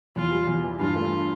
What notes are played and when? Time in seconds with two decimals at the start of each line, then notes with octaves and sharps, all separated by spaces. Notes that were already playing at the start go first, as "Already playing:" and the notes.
0.16 E2 F4
0.31 G3
0.47 E2
0.64 E3
0.80 G2 F4
0.96 A3